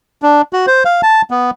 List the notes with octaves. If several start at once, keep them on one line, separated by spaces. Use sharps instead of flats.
D4
F#4
C5
F5
A5
B3